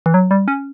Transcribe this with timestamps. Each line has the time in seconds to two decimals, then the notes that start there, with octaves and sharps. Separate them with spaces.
0.06 E3
0.14 F#3
0.31 G3
0.48 C#4